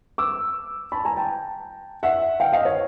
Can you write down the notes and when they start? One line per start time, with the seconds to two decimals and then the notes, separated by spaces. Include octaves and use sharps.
0.18 D6 E6
0.92 A5 B5
1.05 G#5 A#5
1.16 G5 A5
2.03 E5 F#5
2.40 F5 G5
2.53 D#5 F5
2.65 C#5